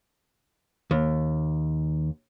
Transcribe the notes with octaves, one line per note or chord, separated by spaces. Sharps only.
D#2